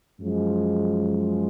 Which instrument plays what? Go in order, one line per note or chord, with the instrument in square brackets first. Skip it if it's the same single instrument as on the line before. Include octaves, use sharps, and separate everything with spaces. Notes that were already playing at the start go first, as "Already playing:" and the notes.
[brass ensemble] F#2 F3 G#3